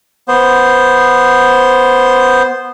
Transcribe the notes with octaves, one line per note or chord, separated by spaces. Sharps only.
B3 C5